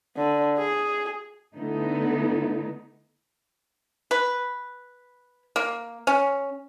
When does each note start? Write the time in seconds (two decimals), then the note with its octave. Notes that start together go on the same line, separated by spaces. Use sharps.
0.16 D3
0.59 G#4
1.55 D3 A3 B3 D#4 E4
4.11 B4
5.56 A#3
6.07 C#4